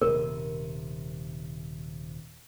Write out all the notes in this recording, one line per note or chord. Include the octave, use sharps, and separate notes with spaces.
D#1 C3 A#4